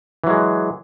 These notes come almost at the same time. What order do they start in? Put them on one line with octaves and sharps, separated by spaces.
E3 F#3 G#3